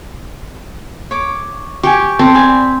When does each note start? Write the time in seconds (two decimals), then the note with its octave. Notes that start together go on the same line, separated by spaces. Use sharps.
1.11 C#5 D6
1.83 G4 G#5 C#6
2.19 C4 A4
2.34 D5 G#5 B5